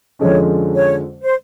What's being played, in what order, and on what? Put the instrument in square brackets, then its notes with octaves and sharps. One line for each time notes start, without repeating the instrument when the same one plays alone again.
[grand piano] F2 D3 F3 G#3 C#4 [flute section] C#5
[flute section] C#5
C5